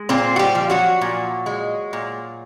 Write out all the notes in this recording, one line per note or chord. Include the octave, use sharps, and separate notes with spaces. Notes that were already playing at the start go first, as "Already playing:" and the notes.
Already playing: G#3
A#2 C4 C5
F#4
G3 G4
F3
F#3 F#4
A#2
G#3
A#2